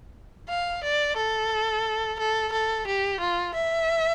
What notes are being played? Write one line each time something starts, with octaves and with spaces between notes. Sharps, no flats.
F5
D5
A4
A4
A4
G4
F4
E5